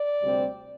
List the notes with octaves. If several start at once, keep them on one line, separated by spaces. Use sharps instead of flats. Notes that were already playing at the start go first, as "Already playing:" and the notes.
Already playing: D5
D2 C3 G3 C4